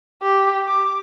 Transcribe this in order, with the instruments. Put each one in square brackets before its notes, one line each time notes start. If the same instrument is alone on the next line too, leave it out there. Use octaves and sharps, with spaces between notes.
[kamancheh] G4
D6